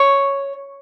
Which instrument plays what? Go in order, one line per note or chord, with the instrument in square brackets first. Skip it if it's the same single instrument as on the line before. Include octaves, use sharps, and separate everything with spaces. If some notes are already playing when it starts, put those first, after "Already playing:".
Already playing: [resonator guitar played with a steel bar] C#5